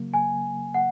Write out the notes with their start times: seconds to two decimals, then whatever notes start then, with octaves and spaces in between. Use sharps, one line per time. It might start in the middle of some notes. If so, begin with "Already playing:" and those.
Already playing: C#3 F#3 A#3
0.14 G#5
0.74 F#5